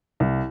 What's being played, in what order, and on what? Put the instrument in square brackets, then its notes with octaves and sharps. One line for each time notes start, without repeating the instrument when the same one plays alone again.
[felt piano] C2